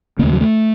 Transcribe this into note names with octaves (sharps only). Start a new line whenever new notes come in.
D#2 C#3 A3 A#3
F#3
A3